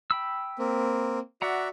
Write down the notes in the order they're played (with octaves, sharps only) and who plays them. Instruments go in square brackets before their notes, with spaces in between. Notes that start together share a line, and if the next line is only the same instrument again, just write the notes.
[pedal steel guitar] G5 B5 E6
[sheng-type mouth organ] A#3 C4
[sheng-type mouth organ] F#4 D5 E5 [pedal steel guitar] F#5 A#5